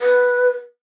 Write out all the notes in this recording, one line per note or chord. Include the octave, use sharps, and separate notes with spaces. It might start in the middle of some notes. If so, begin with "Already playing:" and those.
B4